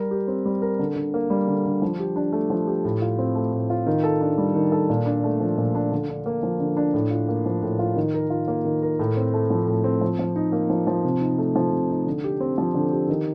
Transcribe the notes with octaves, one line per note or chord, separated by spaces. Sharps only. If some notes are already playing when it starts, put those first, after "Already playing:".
Already playing: G3 A#4
G4
C4
G3
A#4
D3
D3
A#3
G3
D3
D3
F3
G4
D4
A3
F3
G4
A2
F4
C4
A3
A2
F4
D#3
A4
D4
G3
D#3
A4
A#2
D4
A3
F3
A#2
D4
D3
D4
A#3
F3
D3
D4
A2
F4
A#3
F3
A2
F4
D#3
A#4
F4
A#3
D#3
A#4
A2
C4
A3
F3
A2
C4
F3
F3
D#4
A#3
F3
F3
C3
D#4
A3
F3
C3
D#4
D3
G4
C4
F3
D3
G4
D#3